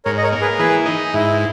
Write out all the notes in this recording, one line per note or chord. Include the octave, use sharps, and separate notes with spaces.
G#2 A#4 C#5
D#5
A#4 C#5
A#3
G#4 B4
E3 G#4 B4
D#4
G#2 E4